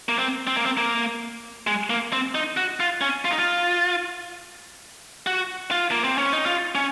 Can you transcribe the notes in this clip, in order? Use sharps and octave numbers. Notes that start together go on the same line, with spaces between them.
A#3
C4
C4
A#3
C4
A#3
G#3
A#3
C4
D#4
F#4
F4
C#4
F4
D#4
F4
F#4
F4
A#3
C4
C#4
D#4
F4
C#4